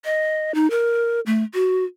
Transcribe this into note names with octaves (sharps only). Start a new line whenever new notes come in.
D#5
D#4
A#4
A3
F#4